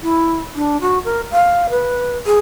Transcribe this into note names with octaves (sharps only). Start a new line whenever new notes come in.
E4
D4
F#4
A#4
F5
B4
G#4